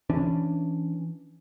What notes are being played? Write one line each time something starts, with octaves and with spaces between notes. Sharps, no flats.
E3 C#4 D4